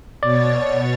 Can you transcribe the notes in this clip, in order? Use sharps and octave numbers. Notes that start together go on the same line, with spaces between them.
B2 C#5 D5 A6